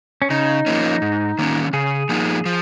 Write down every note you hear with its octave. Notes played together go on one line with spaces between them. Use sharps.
C#4
C#3 D#4
F3 A#3 C#4
G#2
D#3 A#3 C#4
C#3 G#4
F3 A#3 D#4
F3